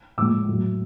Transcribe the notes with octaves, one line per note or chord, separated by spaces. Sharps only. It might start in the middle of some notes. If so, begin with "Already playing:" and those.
A2 F3 G#3 D6 E6
A2 F#3